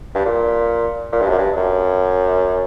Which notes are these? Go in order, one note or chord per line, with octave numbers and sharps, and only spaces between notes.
G2
A#2
A#2
G2
F#2
G2
F#2